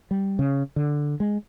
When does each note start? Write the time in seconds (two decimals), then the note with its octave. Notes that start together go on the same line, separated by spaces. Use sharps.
0.11 G3
0.39 C#3
0.76 D3
1.20 G#3